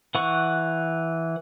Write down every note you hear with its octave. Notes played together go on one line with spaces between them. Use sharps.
E3 F#5 C#6